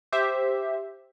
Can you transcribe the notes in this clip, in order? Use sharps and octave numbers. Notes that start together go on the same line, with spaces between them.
G4 C5 E5